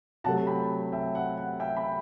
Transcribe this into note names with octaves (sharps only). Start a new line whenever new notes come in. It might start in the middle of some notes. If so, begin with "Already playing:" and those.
C3 F#3 A3 F#5 A5
G5 B5
E5 G5
F#5
F#5
E5 G5
G5 B5